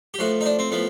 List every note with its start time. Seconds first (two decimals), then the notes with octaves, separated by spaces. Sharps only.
0.14 G4
0.19 A2 F3 F#4
0.41 D#4
0.46 D4
0.59 C4
0.71 A2 F3 B3